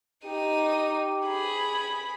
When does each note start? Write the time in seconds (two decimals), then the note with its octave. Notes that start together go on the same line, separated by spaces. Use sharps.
0.25 D#4 G4 D#7
1.27 G#4 B5